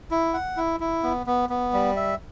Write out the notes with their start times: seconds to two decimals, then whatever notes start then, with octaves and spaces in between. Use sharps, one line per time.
0.11 E4
0.34 F#5
0.57 E4
0.80 E4
1.03 B3
1.27 B3
1.50 B3
1.73 G3
1.96 E5